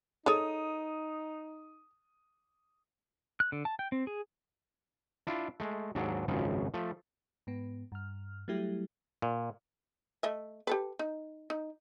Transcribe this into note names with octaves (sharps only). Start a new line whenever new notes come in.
D#4 G#4 A4 C#5 D#6
F#6
D3
A5
G5
C4
G#4
D4 E4 F4
G#3 A3
D#2 G#2 F#3 D4
G#1 C#2 F#2 C#3 F3
F3 A3
G#2 B3
G2 F6
F#3 G3 A3 E4 G4
A#2
A3 D#5 E5
G4 A4 B4
D#4
D#4